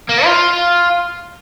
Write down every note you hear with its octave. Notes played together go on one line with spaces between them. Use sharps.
A#3
F4